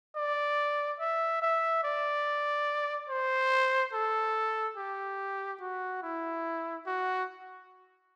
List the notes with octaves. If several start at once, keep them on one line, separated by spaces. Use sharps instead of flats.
D5
E5
E5
D5
C5
A4
G4
F#4
E4
F#4